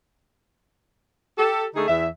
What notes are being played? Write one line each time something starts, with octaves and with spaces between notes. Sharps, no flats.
G4 A4
D3 A3 D#4 G#4
E2 E5